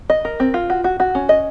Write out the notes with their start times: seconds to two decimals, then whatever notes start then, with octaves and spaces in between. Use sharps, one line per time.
0.10 D#5
0.25 A#4
0.40 C4
0.54 F4
0.70 F#4
0.84 F#4
1.00 F#4
1.15 C#4
1.29 D#5